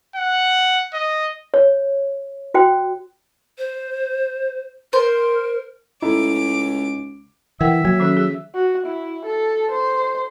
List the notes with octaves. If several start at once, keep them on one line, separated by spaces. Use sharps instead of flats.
F#5
D#5
C#5
F#4 C5 G5
C5
A#4 C5
C#2 A3 D#4 E4 D6
E3 A#4 E5 F#5 G5
F#3 A#3
D#3 C#4 A4
G#4
F#4
E4
A4
C5